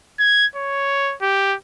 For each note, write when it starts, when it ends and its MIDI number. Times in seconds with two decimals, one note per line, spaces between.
0.19 0.46 92
0.56 1.15 73
1.22 1.55 67